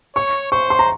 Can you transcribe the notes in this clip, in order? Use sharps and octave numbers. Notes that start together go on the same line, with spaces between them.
C#5 C#6
C5 C#6
C6
A#5